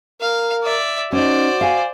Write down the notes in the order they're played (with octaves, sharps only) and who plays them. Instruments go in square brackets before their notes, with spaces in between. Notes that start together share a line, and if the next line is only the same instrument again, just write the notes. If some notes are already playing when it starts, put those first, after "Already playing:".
[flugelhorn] A#4 [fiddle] F5
[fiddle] D5 E5
[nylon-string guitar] C#4 D#4 [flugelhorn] F#4 [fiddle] C5 D5
[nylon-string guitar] F5 G#5